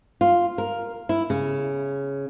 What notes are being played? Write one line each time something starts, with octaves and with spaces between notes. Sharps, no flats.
F4
A#4
E4
C#3